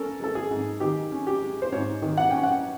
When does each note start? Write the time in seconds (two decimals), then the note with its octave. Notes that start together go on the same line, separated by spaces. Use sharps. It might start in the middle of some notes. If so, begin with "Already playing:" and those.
Already playing: C#4 A4 A#4
0.20 G#3 A4
0.35 G#4
0.51 G#2
0.80 D#3 G4
1.12 C#4
1.27 G4
1.42 G#3
1.62 C5
1.72 G#2 C#5
2.02 D#3
2.17 F#5
2.30 C#4 G5
2.43 F#5